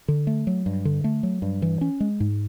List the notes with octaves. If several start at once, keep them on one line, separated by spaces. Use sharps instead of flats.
D3
A3
F#3
G2
D3
A3
F#3
G2
E3
C#4
G#3
G#2